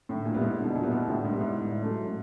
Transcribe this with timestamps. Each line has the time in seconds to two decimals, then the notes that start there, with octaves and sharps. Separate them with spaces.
0.09 A2 D3
0.25 A#2
0.34 G3 B3 E4
0.42 G#2
0.58 D3
0.64 B2
0.75 A#2
0.83 G3 B3 E4
0.91 B2
1.08 A2 D3
1.24 G#2
1.32 G3 B3 E4
1.41 G#2
1.56 A2
1.81 F#3 A3 C#4
2.06 A2